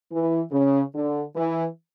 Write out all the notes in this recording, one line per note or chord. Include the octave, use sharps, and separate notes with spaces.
E3
C#3
D3
E3